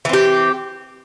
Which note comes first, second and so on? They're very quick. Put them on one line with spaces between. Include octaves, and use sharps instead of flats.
E3 C4 G4